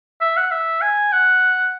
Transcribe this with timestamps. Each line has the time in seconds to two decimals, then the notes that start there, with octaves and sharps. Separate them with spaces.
0.21 E5
0.37 F#5
0.51 E5
0.82 G#5
1.13 F#5